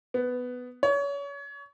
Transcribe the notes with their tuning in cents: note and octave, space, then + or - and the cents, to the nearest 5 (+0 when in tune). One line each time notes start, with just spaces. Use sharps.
B3 +10
C#5 +30